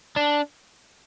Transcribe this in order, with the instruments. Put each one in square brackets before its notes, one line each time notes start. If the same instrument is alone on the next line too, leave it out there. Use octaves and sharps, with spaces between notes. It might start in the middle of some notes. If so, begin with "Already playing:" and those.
[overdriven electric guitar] D4